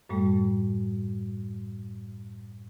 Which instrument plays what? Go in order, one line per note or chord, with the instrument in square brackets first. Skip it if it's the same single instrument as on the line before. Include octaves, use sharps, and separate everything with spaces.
[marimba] F#2 A2 G3 A3